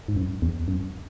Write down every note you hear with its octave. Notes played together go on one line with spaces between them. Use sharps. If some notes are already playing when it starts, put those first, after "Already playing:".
G#2
F#2
E2
F#2